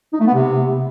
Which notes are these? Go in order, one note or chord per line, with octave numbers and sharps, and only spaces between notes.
D#4
A3
B3
C3